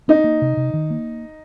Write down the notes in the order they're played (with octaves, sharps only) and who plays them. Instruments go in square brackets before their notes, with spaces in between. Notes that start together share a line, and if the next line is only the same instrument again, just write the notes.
[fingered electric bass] C4 [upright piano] D#4
[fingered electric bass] A#3
C3
C3
D#3
A#3